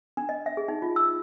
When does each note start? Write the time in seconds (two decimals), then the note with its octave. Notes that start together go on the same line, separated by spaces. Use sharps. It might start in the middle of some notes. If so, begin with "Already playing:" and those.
0.17 D4
0.29 D#5
0.46 E5
0.57 G#4
0.68 D#4
0.82 F4
0.96 E6